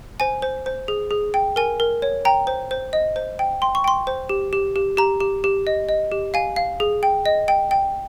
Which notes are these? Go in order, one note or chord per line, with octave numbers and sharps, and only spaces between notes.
C5 G#5
C5
C5
G#4
G#4
G5
A#4 G#5
A#4
C#5
G5 A#5
C5
C5
D#5
C5
G5
G5 C6
C#6
G5 C6
C5
G4
G4
G4
G4 A#5
G4
G4
D#5
D#5
G4
F5 G#5
F5
G#4
G5
D#5
G5
G5